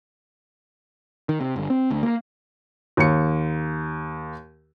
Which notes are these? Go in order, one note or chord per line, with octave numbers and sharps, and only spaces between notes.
D#3
C3
G1
C4
D2
A#3
D#2 C#7